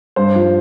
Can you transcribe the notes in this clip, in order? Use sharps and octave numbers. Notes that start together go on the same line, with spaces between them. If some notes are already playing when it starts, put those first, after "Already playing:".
G2 C5
F3